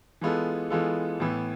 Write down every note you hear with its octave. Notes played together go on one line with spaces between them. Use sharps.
E3 G#3 B3 F4 A4
E3 G#3 B3 F4 A4
A2 E3 B3